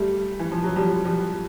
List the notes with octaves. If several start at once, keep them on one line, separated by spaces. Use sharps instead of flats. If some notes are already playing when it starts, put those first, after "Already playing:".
Already playing: G3 A3
E3
F3
F#3
F3 G3
F3 G3